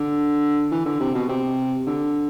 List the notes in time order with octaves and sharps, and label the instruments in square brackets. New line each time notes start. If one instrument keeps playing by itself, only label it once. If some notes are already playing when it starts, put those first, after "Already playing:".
Already playing: [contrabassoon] D3
E3
D3
C3
B2
C3
D3